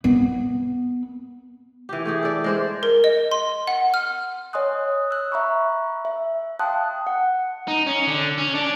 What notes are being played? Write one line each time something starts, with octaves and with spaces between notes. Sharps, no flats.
B3
E3 G4
A3 G4 G#4
A4 D5
G#3 C5 D5
A#4
D#5
C6
F#5
F6
C#5 D#5 G#5 C6 D#6 F#6
E6 F#6
E5 A#5 B5 C#6
E5
F5 G5 A5 C6 D#6 F#6
F#5
D#4
C#4
D3
C#4
D4